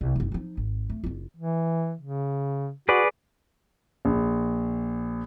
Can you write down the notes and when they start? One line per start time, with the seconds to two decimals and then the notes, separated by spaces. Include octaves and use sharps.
0.01 C2
0.16 F#1 D#4
0.32 F3 D#4
0.57 G#1
0.89 A3
1.04 F#1 F4
1.36 E3
2.01 C#3
2.89 F#4 G#4 B4 D5
4.05 A#1